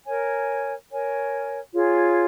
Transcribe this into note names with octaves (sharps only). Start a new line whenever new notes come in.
A#4 C#5 G#5
A#4 C#5 G#5
F4 G#4 C#5